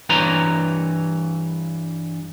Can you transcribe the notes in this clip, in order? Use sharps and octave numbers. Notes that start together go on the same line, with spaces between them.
G2 E3 B4 C#5 A#5 C6